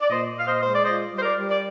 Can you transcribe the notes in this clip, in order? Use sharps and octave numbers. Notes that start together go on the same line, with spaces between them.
D5
A#2 C5 D#5
A#2 F5
C5 D#5
G#3 C5
D5
F4 C5 D#5
G3
C5
A#4 D5
G3
D5